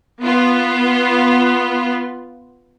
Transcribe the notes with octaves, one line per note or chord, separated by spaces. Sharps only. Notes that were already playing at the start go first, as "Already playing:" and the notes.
B3 F4